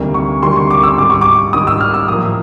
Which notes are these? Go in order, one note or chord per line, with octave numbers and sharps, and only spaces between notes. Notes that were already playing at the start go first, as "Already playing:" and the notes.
Already playing: D2 C3 D#3 G3 A#3
C#6
D2 C3 D#3 G3 A#3 C6
C#6
D6
E6
G#2 D#3 G3 D6
C#6
D6
G#2 D#3 G3 D#6
E6
F6
E6
A2 F3 A#3 D#6